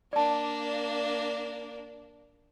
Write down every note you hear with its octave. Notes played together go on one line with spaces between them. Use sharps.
A#3 D4 D5 A5